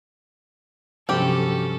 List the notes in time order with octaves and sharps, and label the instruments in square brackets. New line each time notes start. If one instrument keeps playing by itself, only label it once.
[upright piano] G2 F#3 [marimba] C3 F3 [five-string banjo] C4 G4 [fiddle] C#4 A4